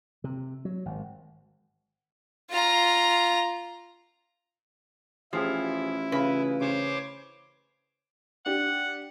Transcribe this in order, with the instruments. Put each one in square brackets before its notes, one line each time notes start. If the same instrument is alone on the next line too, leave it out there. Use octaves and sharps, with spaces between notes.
[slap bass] C3
F#3
G#1
[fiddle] F4 A#5
[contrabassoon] A1 [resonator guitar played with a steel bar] F3 [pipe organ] E4 [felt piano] G4 G#4 G#5
[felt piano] C#3 F4 [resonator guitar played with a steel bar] B4
[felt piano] C#3 C6 E7 [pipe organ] C5 C#5 D6
[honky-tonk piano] D4 G4 [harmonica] F#5